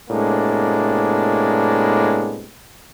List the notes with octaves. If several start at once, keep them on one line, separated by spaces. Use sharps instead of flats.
A2 C3 G#3 A#3 B3 D4